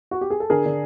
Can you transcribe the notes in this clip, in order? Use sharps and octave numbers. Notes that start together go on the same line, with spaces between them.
F#4
G4
G#4
A4
D3 G#4 A#4
D3